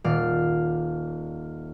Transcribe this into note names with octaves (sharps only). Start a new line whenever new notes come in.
D#1 D5 F5